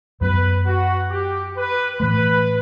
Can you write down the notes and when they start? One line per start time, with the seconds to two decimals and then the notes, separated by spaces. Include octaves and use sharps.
0.21 F#2 F#3 B3 B4
0.65 F#4
1.10 G4
1.55 B4
2.00 A2 E3 A3 B4